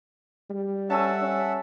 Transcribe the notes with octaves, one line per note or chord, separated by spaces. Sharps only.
G3
C#4 A4 E5 F#5 G#5 A5
C#4